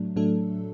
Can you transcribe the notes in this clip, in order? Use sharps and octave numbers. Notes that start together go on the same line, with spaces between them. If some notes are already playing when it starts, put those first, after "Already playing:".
Already playing: A2 F#3 A3 D4
A2 F#3 A3 D4 A4